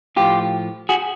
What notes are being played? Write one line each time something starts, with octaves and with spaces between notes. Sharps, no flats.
A2 F3 F4 G4
F#4 G#4